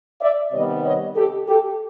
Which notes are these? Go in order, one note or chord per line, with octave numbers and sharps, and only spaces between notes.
D5 E5
C3 D#3 G3 B3 C#5 D#5
C#5 D#5
G4 A4
G4 A4